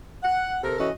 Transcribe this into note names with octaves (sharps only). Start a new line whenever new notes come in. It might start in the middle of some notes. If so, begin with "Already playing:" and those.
F#5
C3 A4 A#4
E3 C#4 F#4 A4 D#5